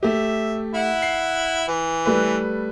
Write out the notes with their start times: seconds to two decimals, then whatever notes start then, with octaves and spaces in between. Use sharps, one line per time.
0.03 A3 G4 E5
0.75 E4 F#5
1.02 C7
1.68 E3
2.06 G3 A3 B4